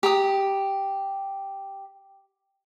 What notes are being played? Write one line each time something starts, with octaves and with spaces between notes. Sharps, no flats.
G4 A#5 D#6